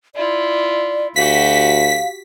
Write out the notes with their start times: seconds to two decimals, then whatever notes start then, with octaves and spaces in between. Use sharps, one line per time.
0.15 E4 F4 D5
1.16 D2 F#4 G4 F5 B6